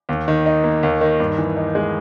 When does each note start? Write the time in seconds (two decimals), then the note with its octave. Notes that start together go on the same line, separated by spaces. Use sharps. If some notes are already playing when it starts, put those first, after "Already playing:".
0.09 D#2
0.28 D#3
0.46 D#4
0.64 A#3
0.83 D#2
1.01 D#3
1.20 G2
1.38 E3
1.57 D#4
1.75 G#3